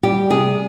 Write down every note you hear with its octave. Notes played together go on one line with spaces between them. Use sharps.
G3 G4
C3 G#4